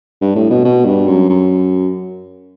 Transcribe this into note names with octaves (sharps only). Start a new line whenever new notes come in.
G2
A2
B2
B2
G2
F#2
F#2